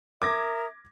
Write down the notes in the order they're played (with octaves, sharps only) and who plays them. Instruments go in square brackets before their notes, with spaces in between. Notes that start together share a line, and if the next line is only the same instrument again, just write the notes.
[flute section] A#4 E5 D#6 [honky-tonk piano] D6 G#6 A#6